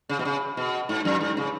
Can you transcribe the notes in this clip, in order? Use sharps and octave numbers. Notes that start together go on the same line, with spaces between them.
C#3
B2
C#3
B2
G#2
F#2
G#2
C#3